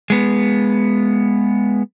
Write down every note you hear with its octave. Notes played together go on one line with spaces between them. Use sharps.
G#3 B3